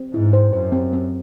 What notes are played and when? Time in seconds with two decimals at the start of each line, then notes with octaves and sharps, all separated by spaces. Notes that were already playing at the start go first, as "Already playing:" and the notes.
Already playing: C4
0.13 G#2 E4
0.33 C5
0.53 F#2 C5
0.72 C4
0.93 C4